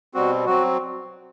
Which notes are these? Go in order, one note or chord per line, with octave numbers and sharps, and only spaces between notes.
B2 G3 C4 F#4
F#3 C4 F#4